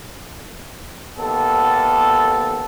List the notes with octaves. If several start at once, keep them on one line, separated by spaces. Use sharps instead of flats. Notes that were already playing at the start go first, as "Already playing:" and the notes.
D#2 B3 A4